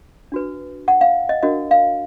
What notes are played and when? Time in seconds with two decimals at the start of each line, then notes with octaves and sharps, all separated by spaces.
0.32 D4 F#4 B4
0.88 F#5
1.01 F5
1.29 D#5
1.43 D4 F#4 A#4 D#5
1.71 F5